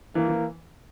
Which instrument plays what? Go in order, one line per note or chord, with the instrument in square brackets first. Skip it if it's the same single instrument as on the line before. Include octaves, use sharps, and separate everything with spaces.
[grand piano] E3 [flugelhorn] A#3
[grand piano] E3